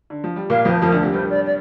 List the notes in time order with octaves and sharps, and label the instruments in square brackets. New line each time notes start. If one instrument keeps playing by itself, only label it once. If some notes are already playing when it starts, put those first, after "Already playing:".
[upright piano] D3
F3
G3
[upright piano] A#2 A#3 [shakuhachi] F5
[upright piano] F2 F3 [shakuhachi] C5
[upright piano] F2 F3 [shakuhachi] A#4
[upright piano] D2 D3
C3
[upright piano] G2 G3 [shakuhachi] C5
[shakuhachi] D5
D5